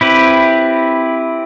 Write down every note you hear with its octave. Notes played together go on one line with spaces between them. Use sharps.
C4 E4 G4 B4